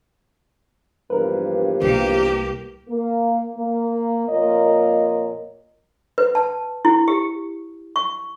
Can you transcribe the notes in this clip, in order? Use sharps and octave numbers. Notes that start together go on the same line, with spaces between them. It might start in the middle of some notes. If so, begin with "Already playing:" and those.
A#1 E2 G2 A#4 B4
C2 A#3 G4
A#3
A#3
F2 A#2 A#3 A#4 C#5 D#5
B4
A5
E4
G4
C#6